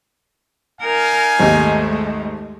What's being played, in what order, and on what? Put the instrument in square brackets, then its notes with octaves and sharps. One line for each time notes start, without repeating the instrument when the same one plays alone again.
[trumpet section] D#4 F5 G#5 [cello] A#4
[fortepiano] G#1 D#2 [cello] G#3 A3